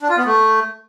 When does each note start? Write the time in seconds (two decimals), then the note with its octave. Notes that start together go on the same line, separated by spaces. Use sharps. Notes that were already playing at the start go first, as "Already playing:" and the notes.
0.01 D4
0.09 F4
0.18 B3
0.26 A3